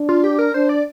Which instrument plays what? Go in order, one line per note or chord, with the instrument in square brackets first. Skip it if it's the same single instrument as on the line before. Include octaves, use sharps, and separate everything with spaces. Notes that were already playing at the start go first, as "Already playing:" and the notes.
Already playing: [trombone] D4
[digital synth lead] F4
G4
A#4
[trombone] D4 [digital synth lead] C5
[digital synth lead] D5